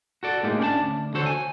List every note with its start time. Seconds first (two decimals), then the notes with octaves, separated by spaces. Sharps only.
0.23 F#4 A4 D5
0.43 A2 G#3 A#3 D#4 G4
0.59 C#4 D4 F#5 A5
0.81 D2
1.14 D3 F#4 A4 C5 C#5
1.26 G#5